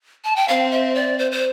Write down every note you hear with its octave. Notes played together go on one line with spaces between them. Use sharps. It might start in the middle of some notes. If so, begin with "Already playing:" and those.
A5
G5
C4 F5
E5
D5
C5
C5